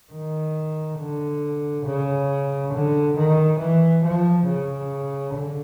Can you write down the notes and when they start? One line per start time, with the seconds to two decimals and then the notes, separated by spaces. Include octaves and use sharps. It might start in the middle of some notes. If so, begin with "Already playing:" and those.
0.12 D#3
0.99 D3
1.85 C#3
2.73 D3
3.17 D#3
3.59 E3
4.04 F3
4.47 C#3
5.34 D3